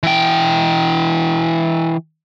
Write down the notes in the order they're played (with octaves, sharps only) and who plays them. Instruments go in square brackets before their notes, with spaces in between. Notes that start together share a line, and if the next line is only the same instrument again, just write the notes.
[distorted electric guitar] E3 G5